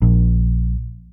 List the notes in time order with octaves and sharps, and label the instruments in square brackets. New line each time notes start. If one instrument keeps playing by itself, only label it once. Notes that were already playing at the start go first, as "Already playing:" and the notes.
[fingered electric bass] A#1